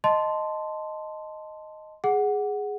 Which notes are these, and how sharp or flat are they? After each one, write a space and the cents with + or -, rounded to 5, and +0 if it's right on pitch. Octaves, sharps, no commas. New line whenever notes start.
D#5 +0 A5 +0 C6 -5
G#4 +0 F#5 +0